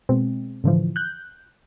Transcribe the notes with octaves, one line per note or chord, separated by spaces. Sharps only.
B2 G#3 C4
A2 D3 E3 F3
F#6 G6